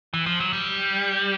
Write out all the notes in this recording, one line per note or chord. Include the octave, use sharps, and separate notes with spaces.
E3
F3
F#3
G3